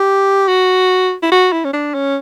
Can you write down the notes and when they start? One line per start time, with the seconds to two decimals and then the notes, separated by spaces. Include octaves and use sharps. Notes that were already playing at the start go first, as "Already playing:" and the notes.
Already playing: G4
0.48 F#4
1.23 E4
1.32 F#4
1.53 E4
1.65 C#4
1.74 D4
1.94 C#4